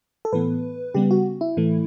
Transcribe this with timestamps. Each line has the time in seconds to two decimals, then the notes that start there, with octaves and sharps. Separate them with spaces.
0.25 A4
0.33 A2 E3 B3 B4
0.94 C#3 G3 B3 G4
1.11 F#4
1.41 E4
1.57 A2 E3 A3